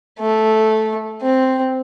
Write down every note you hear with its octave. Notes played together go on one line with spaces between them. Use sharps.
A3
C4